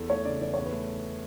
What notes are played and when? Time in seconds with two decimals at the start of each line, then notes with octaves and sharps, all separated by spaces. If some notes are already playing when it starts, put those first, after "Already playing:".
Already playing: E2 A4
0.09 A3 C#5
0.25 C#3 D5
0.41 E3 D5
0.54 E2 C#5
0.66 B4
0.73 A3